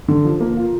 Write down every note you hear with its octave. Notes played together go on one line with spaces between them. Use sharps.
D3
F3
A#3
F4